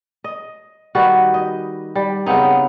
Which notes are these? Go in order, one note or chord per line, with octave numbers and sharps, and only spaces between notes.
D#5
D#3 G3 F#4 B4
D#5
G3
C#3 B3 C4 D#4